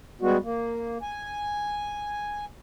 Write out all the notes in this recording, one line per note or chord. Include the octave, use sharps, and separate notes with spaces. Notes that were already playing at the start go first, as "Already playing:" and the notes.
G3 G#3 B3 F#4
A#3
G#5